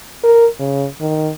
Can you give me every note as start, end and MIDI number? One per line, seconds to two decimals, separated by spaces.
0.24 0.47 70
0.60 0.87 49
1.01 1.32 51